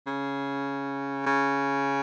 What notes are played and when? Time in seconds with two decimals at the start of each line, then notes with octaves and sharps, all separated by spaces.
0.07 C#3
1.26 C#3